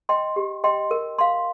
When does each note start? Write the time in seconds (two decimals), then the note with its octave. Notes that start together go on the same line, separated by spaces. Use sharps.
0.09 D#5 G5 C6
0.36 G4
0.64 D#5 G5 C6
0.91 A#4
1.18 F5 C6